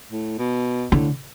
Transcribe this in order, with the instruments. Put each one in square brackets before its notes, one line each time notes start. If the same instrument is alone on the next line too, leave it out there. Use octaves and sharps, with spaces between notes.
[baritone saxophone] A2
B2
[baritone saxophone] A2 [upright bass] D3